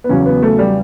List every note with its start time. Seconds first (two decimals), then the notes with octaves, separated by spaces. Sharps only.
0.04 B3
0.09 E2 C#3 F#3 C#4
0.26 B3
0.43 A3
0.59 G3